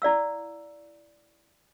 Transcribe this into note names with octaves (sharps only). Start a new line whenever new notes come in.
E4 D5 F5 E6